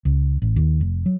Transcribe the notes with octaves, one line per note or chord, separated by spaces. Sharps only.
C#2
A1
D#2
F1
F#3